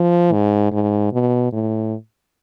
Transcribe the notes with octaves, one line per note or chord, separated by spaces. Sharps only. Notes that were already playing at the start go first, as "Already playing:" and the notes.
Already playing: F3
G#2
G#2
B2
A2